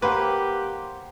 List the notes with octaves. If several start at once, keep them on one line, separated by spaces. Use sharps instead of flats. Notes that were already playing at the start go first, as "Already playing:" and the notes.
A#3 G4 B4 C5 F#5 G5